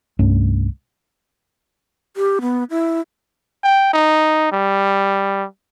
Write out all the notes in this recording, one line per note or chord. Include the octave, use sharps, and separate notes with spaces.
C2 G2 A3 C#4
G4
B3
E4
G5
D#4
G3